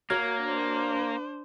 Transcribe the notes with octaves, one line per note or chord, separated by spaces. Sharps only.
A#3 F#4 A#4 C#5 F6 G#6
D4 C5